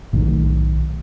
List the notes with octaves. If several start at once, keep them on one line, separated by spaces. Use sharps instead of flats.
B1 A2 D#3